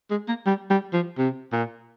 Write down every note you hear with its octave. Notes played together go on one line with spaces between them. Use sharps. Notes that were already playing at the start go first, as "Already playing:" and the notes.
G#3
A#3
G3
G3
F3
C3
A#2